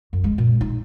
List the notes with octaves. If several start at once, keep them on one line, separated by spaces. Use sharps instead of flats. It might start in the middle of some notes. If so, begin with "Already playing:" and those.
F#2
G#3
A#2
D#4